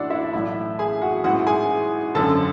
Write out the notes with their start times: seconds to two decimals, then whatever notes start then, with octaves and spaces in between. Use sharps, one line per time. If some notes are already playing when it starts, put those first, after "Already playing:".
Already playing: A1 A2 E3 D4 F#4 A4 D5 F#5
0.10 E4 E5
0.23 D5
0.33 B1 A2 E3 E4 E5
0.79 G#4 G#5
1.02 F#4 F#5
1.24 A1 G#2 E3 F#4 F#5
1.47 G#4 G#5
2.15 G#1 F#2 D3 A4 A5